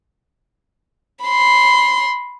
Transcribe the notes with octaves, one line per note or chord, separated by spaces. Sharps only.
B5 C6